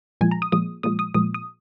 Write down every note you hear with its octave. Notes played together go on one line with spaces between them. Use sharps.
A#2 F3 G#3 G#5
A#5
D#6
A#2 F3 G#3 D#6
A#2 F3 G#3 D#6
D#6
A#2 F3 G#3 D#6
D#6